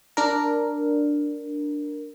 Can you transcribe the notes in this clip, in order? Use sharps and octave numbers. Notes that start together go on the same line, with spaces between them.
D4 A#4